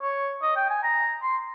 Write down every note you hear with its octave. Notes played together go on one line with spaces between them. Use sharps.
C#5
D#5
G5
G#5
A#5
C6